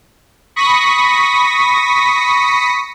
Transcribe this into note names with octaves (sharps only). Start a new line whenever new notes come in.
B5 C#6 D#6 A#6 B6